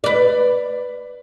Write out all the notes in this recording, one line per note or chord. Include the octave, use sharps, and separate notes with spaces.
B4 D5